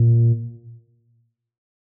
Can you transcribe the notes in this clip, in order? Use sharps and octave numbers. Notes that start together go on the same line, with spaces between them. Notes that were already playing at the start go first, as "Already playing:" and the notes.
Already playing: A#2